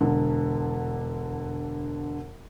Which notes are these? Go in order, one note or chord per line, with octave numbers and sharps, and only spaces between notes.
E1 D3